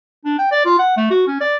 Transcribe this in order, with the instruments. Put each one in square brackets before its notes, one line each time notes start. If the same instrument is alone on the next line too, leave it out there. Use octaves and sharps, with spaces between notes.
[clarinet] D4
G5
D5
F4
F#5
A3
F#4
C#4
D5